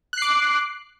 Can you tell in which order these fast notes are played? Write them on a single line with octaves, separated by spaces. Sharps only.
F#6 C7 D6